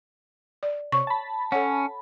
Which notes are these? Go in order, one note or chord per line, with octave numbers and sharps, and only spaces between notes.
D5
C3 C#5 C#6
A5 B5
C#4 A4 C#5 F#5